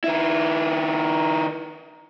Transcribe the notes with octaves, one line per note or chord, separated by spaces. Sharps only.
D#3 E4